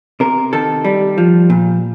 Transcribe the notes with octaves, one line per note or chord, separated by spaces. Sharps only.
C3 A#4
D#3 A4
G3
F3
A#2